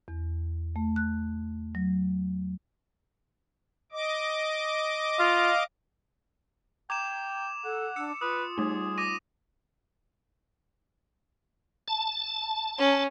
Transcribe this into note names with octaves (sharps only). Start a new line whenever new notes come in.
E2
A3
F#6
F#3
D#5 D6
F4 F5
G5 A#5 D6 G#6 E7
A4 F#5
D4 E6 C#7
F4 B4 D#6
G3 A3 D#4 G#4
D6 A#6 D#7
A5
C#4